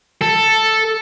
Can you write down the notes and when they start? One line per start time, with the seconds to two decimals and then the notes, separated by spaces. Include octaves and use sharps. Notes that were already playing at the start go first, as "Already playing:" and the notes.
0.22 A4